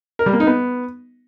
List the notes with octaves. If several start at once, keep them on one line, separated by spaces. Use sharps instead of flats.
A#4
G3
A#3
D#4
B3